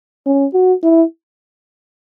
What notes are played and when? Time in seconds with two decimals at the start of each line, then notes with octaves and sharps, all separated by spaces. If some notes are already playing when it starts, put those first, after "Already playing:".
0.26 C#4
0.54 F#4
0.83 E4